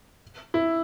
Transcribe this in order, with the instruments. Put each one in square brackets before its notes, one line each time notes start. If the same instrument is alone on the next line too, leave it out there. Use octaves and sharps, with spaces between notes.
[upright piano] E4